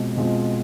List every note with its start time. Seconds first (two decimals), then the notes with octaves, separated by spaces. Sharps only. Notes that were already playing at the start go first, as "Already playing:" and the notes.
Already playing: B2 G#3 C4 F4
0.17 B2 G#3 C4 F4